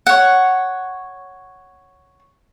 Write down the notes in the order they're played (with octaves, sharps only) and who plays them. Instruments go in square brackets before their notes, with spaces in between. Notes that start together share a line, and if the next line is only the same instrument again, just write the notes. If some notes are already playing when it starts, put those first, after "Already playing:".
[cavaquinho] C#5 F#5